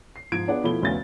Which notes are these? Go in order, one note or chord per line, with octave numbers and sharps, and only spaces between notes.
C7
G#2 F3 G#6 D7
B3 D4 F4 G#4 F#5
B2 F3 A3 E4 B5 G7
F1 D2 B3 C#4 F5 A6